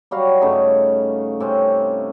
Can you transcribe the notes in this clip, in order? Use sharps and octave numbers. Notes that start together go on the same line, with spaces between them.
F#3 G3 F#4 F5
G2 C#3 A3 D#4
C3 C4 C#4